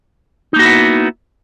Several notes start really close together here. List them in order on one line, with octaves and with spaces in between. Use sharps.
D#4 A#3 F#4 E4 B3